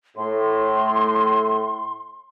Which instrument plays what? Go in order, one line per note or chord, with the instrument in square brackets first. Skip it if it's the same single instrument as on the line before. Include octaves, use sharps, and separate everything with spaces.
[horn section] A2 [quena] C6